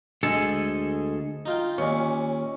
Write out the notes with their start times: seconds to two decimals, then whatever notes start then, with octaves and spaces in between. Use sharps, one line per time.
0.23 D2 G#3 G#4 A4 D#5
1.46 D#4 F4 G5
1.78 D#2 A#2 C#4